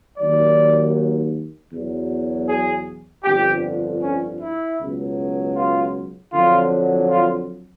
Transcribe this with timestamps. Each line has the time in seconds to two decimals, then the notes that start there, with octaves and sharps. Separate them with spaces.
0.17 D#2 D#3 F#3 D5
1.70 E2 B2 F#3
2.48 G#4
3.24 G1 F2 D3 G4
4.01 C#4
4.40 E4
4.79 C#2 B2 F#3
5.56 F4
6.32 F2 D3 F#3 F4
7.09 F4